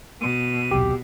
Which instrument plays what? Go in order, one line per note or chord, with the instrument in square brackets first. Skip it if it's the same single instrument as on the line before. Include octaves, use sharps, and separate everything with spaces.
[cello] B2 [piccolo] D#7
[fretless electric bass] D#1 B1 C3 [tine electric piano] G4